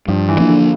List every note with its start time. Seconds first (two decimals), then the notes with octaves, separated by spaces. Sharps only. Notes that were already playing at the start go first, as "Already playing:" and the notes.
0.08 G2 F3
0.29 E3
0.38 F3 A#3 D4
0.49 D3